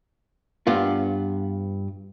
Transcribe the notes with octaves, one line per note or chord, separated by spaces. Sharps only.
G2 B3 F4